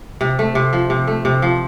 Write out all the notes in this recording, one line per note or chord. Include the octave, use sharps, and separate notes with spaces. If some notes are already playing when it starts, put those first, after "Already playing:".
C3
A3
C3
F3
C3
A3
C3
F3